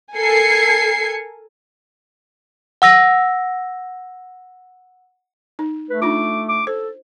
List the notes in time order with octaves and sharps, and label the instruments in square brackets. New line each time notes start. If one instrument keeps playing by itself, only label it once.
[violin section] A4 A#4 G#5 G#6 C7 C#7
[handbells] F#5 E6 A#6
[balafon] D#4
[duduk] A3 [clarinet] B4
[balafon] D4 D#4 F4 [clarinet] D6
[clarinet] D6
[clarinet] A4 [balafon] C5